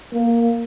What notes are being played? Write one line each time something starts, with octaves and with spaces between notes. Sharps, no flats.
A#3